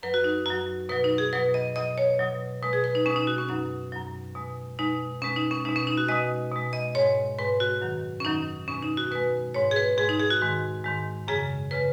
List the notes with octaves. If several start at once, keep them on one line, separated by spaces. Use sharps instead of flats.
F#2 F#3 B4
F#4
D#4
F#2 F#3 F#4
B2 F#3 B4
D#4
G#4
B2 F#3 B4
D#5
B2 F#3 D#5
C#5
B2 F#3
B2 G#3 B4
G#4
B4
D#4
B2 G#3 C#4
D#4
F#4
C#4
F#2 F#3 D#4
F#2 F#3
B2 G#3
B2 G#3 D#4
B2 G#3 C#4
D#4
C#4
B2 G#3 D#4
C#4
D#4
F#4
B2 G#3 D#5
B2 G#3
D#5
G#2 G#3 C#5
G#2 G#3 B4
F#4
F#2 D#3 F#3
C#4
F#2 D#3 F#3 D#4
B2 G#3 C#4
D#4
F#4
B2 G#3 B4
G#2 G#3 C#5
G#4
B4
G#2 G#3 G#4
D#4
G#4
F#4
G#2 D#3 G#3
G#2 D#3 G#3
F#2 C#3 G#3 G#4
C#3 G#3 B4